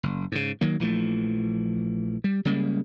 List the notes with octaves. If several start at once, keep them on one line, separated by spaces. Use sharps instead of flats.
F#1
G#2 C#3
D#3 F#3 A#3
A#1 E3 F3 A3
G3
C#3 G3 G#3 A#3